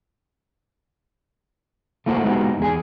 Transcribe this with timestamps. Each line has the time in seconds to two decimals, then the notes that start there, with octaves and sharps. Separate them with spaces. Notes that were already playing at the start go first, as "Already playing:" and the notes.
2.06 A3 A#3 E4 F#4 C5 F#5
2.24 G#3 B3 D#4 F#4 G4
2.60 E2 G#4 G#5